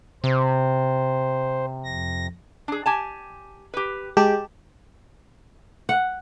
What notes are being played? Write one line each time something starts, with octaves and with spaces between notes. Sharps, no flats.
C3 C5
F2 A#6
D4 G#4
G4 G#5 A5
G4 B4
G#3 G4 A5
F#5